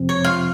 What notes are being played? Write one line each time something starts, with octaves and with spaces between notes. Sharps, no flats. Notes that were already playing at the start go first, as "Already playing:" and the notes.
Already playing: F2 C3 F3 C4
C#5
F4 F5